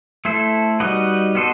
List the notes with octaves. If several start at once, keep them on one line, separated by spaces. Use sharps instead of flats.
A3 E4 A4 C5
G3 D#4 F#4 B4 D#5
B3 F#4 A4 C5 D#5